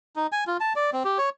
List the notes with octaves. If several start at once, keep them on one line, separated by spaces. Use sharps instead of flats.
D#4
G#5
F4
A5
D5
C4
G4
C#5